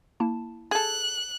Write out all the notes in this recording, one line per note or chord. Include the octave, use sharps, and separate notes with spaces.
A#3 E4 A5
G#4 A4 F#6